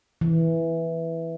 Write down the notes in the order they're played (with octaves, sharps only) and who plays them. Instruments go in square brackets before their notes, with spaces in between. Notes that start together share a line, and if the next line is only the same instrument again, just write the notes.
[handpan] E3